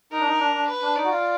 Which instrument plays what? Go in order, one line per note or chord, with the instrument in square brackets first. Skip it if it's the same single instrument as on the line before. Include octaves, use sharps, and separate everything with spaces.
[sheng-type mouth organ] D#4 [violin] A#4
[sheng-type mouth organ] D4
D#4
D4
D4
[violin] B4
[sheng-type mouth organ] D4
[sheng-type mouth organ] D#4 [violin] D5
[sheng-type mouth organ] F#4
F4